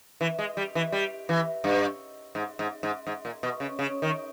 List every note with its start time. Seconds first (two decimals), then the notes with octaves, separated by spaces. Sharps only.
0.21 E3
0.39 G#3
0.57 G3
0.75 E3
0.92 G3
1.29 E3
1.64 G2
2.35 G#2
2.59 G#2
2.83 G#2
3.07 G#2
3.25 A#2
3.43 B2
3.60 C#3
3.79 C#3
4.02 D#3